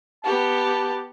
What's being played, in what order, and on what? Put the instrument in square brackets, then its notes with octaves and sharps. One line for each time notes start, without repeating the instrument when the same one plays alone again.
[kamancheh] B3 G4 [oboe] A5